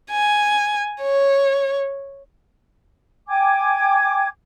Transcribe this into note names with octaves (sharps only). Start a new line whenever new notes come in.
G#5
C#5
G5 G#5 D6 G#6